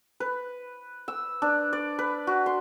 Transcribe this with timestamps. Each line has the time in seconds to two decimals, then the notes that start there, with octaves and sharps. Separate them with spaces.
0.20 B4
1.08 E6
1.42 D4
1.73 D5
1.99 B4
2.27 F#4
2.46 C6